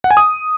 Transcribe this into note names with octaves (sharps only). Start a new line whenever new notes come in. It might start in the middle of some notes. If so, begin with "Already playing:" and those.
F#5
G#5
D#6